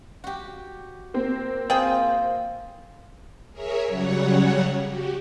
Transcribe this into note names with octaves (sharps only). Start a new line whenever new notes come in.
F#4 G4
A#3 C4
F4 G#4 C5 G5
G#4 A#4 C#5 E5
C#3 F#3 G3 C#5 F#5
F#4 G4